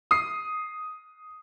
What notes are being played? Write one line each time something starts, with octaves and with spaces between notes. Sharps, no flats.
D#6 C7